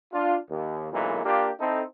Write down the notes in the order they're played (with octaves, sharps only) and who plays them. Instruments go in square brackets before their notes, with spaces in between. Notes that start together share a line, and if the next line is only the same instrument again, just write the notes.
[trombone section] D4 F4
D#2
B1 F#2 A#2 E3 G#3
A#3 D4 F4 G4
C4 D#4 E4 A4